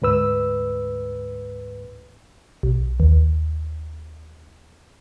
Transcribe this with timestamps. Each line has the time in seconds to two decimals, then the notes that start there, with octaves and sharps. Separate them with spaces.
0.02 D2 G#2 B4 E6
2.63 B1
3.00 D#2